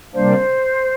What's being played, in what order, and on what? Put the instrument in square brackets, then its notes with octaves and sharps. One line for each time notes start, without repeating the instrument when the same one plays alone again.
[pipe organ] C3 G3 A#3 D4 [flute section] C5